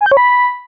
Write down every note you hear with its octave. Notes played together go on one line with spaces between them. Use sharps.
G#5
G6
C#5
B5